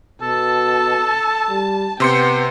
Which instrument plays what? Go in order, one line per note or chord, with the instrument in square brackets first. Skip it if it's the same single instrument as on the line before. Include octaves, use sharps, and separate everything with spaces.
[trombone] B2 [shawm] A4 [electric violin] A5
[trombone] G3
[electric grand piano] C3 C6 C#7 [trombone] B3 [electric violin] G5